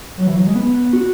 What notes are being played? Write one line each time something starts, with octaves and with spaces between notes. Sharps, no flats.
F#3
E3
F#3
G#3
B3
F#4